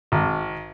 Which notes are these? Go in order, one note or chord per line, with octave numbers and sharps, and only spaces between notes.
G#1